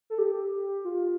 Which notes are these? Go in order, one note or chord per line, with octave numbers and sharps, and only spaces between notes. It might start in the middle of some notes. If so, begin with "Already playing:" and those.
A4
G4
F4